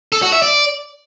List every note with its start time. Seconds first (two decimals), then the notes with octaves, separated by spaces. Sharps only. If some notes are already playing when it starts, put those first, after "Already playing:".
0.12 A4
0.22 F#4
0.32 E5
0.42 D5